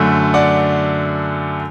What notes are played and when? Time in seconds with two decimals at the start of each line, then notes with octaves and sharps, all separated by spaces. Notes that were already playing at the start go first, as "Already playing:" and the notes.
Already playing: F#2 D3 A3
0.34 D5 F#5